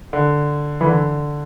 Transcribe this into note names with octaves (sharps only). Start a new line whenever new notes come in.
D3
E3
D3